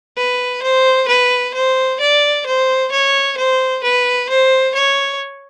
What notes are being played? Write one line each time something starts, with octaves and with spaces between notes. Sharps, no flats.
B4
C5
B4
C5
D5
C5
C#5
C5
B4
C5
C#5